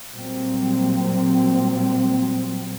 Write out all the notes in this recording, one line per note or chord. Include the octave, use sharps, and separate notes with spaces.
A#2 F#3 G3 A#3 C4